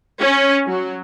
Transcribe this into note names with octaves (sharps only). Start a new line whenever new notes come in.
C#4
F#3